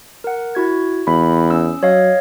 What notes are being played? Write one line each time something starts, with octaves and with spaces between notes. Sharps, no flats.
A#4 F#5
E4 F#4 G#6
E2 B5
C#4 E6
F#3 C#5 D#5 F5